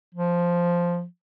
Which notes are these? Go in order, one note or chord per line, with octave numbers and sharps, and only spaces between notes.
F3